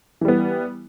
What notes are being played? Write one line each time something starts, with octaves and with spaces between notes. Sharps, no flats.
E3 G3 B3